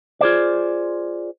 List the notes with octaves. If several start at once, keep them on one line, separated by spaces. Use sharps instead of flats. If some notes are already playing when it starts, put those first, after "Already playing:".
F4 G#4 C5 D5